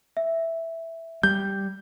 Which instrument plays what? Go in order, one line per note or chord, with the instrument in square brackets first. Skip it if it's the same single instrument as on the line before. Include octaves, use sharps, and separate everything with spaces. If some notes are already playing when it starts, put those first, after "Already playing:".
[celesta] E5
[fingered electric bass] G3 [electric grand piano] G6